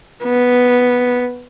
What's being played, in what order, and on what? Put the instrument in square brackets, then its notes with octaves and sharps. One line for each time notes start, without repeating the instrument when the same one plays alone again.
[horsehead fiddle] B3